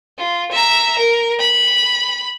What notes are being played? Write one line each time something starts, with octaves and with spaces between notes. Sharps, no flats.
F4
E5 A#5
A#4
B5